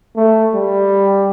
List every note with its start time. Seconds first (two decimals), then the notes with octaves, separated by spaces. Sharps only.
0.16 A3
0.54 G3